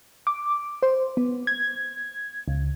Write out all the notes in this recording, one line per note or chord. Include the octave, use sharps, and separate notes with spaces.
D6
C5
B3
G#6
C#2